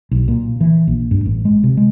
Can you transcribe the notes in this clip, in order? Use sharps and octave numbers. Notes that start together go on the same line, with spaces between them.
B1
A#2
E3
A#1
G2
A1
G#3
C3
G#3